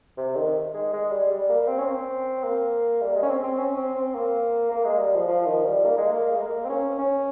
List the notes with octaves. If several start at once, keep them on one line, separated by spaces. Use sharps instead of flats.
C3
D#3
G#3
G#3
G3
G3
A#3
C4
C#4
C4
A#3
G3
G#3
C#4
C4
C4
C#4
C4
C4
A#3
A#3
G#3
G3
F3
F3
D#3
G3
A#3
G#3
A#3
G#3
A#3
C4
C#4
C#4